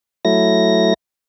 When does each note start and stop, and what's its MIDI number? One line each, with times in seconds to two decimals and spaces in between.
0.25 0.94 54
0.25 0.94 57
0.25 0.94 64
0.25 0.94 94